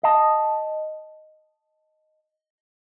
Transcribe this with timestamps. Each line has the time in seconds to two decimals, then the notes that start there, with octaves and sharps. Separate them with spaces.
0.03 D#5 A5